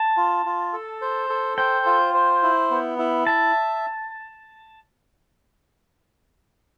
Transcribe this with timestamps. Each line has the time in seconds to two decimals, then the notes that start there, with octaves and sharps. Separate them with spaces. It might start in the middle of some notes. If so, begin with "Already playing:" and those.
Already playing: A5
0.17 F4
0.46 F4
0.73 A4
1.02 C5
1.30 A4
1.58 C5 G5
1.86 F4
2.14 C5
2.43 E4
2.71 B3
2.99 E4
3.27 E5 A5